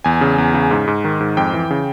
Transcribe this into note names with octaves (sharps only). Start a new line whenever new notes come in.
E2 G#5
C#3
E2
C#3
G#2
G#2
D#3
G#2
F2 G5
E3
C#3